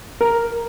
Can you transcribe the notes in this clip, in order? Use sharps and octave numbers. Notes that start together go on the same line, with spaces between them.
A#4